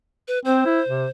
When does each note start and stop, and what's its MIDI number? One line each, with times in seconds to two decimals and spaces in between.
0.28 0.39 71
0.45 0.65 60
0.45 1.10 72
0.65 0.80 64
0.88 1.06 48